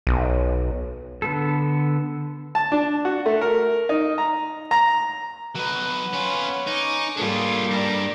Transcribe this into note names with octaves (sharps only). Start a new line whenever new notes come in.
B1
D3 B3 A4
A5
D4
F#4
A3
A#4
D#4
A#5
A#5
F#3 B4 D#5
B3 C#4 F4
D#4 C#6 D6
G#2 G3 A#3 D4 F4 G#4 A4
G2 D5 A#5